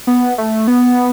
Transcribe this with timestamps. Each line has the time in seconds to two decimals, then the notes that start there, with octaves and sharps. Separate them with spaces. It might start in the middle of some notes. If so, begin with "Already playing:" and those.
0.07 B3
0.38 A3
0.68 B3